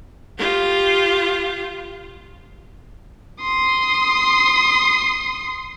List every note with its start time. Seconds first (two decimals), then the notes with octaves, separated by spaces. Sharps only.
0.38 F4 G4
3.41 C6 D#6